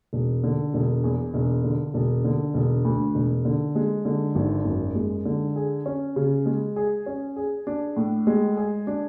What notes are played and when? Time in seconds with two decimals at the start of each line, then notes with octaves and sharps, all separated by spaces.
0.13 E1
0.44 D3
0.74 E1
1.04 E2
1.34 E1
1.64 D3
1.94 E1
2.25 D3
2.54 E1
2.85 D2
3.15 E1
3.45 D3
3.75 G#3
4.05 D3
4.35 G#1
4.65 F#2
4.95 G#3
5.25 D3
5.56 G#4
5.86 C#4
6.16 C#3
6.46 G#3
6.76 G#4
7.06 C#4
7.36 G#4
7.67 D4
7.97 A2
8.27 G#3
8.57 G#4
8.87 D4